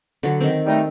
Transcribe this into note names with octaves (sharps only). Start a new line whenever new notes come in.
D3 F#3
D#3 C4
G3 A3 D#4